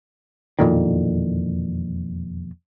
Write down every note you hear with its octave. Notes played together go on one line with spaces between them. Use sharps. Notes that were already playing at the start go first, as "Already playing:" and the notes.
E1 F2 A#2 D#3